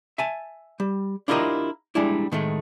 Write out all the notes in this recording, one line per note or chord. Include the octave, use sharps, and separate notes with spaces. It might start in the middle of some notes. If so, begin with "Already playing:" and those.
E5 G#5 A5
G3
D4 E4 F4 G4 A#4 D#5
G3 G#3 D4 E4
A2 D#3 G#3 A3